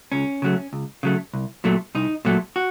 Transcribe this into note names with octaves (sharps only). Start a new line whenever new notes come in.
C#2 C#4
C#3 F#3 A3
C#2
C#3 F#3 A3
C2
A#2 F#3 A3
C2 D#4
A#2 F#3 A3
F#4